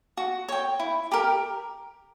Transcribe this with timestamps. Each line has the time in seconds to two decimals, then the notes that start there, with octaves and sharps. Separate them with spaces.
0.17 F#4
0.48 C#5 G5
0.80 E4
1.12 G4 A#4